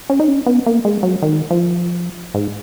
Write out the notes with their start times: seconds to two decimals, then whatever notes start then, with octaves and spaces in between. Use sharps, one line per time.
0.10 C#4
0.20 D#4
0.28 C#4
0.46 B3
0.66 A#3
0.85 G#3
1.03 F#3
1.22 D#3
1.50 F3
2.34 G#2